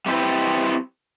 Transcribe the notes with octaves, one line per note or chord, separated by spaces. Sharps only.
G3 A3 C4 E4 G4 B4